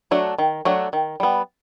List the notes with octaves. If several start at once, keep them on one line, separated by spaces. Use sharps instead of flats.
F#3 A3 D4 F#4
D#3
F#3 A3 D4 F#4
D#3
G3 B3